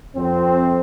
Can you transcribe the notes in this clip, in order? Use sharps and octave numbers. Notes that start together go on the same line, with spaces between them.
F2 C4